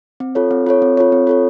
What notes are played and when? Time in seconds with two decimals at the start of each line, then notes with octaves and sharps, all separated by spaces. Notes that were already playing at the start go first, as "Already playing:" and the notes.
0.20 C4
0.35 F4 A4 C#5
0.51 C4
0.66 F4 A4 C#5
0.82 C4
0.97 F4 A4 C#5
1.12 C4
1.27 F4 A4 C#5